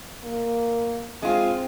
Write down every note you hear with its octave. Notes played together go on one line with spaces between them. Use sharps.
A#3
G#3 C4 F4